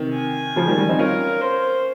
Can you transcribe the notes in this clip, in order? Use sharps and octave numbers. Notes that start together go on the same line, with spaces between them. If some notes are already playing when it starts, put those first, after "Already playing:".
Already playing: C3 D#3
G#5
C#3 F3
D#3 G3
D#3 G3
C4 D#4
C#4 F4 A#4
C5